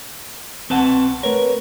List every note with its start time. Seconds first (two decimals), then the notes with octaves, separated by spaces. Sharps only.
0.70 C2 C4 B4 F#5 A5
1.23 A3 A#4 B4 C#5